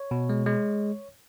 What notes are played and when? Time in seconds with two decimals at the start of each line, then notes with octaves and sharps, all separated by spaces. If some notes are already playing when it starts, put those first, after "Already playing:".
Already playing: C#5
0.11 B2
0.29 G#3
0.46 G#3